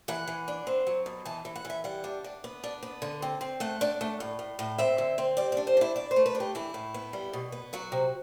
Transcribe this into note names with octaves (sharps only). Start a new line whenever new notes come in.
E3 F#5
E3
D4
C4
F#3
B2
E3 A5
E3
F#5
E3
E5
G3 F#5
D4
D4
B3
D4
B3
D3
C4
C4
A3 F#5
D4
A3
A2
A2
A2
C4 E5
D3
C4
G3 D5
D4 D5
C5
D4 E4
B2 D5
C5
A3
B4
D4
G4
E3 E4
A2
B3
G3
B2
B3
F#3 F#4
C3